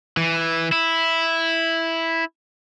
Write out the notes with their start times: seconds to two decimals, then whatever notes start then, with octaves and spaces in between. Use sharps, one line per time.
0.17 E3
0.72 E4